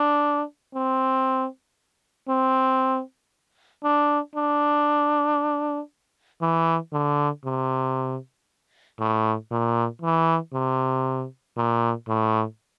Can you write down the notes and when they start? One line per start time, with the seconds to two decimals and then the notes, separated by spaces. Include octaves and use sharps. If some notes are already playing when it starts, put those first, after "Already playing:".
Already playing: D4
0.75 C4
2.29 C4
3.84 D4
4.36 D4
6.41 E3
6.93 D3
7.45 C3
8.99 A2
9.51 A#2
10.02 E3
10.53 C3
11.57 A#2
12.08 A2